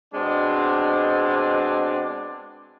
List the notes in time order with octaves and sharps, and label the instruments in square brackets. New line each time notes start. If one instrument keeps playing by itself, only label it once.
[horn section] B2 G#3 C4 D4